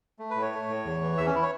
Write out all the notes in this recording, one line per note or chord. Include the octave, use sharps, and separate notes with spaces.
A3
B4
A2
C#5
A3
A2
E2
E3
E2 E5
C#4
E4
C#5